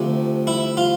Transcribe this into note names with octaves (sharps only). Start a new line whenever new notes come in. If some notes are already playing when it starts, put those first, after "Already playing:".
Already playing: D2 C3 F3 A3
E4
F4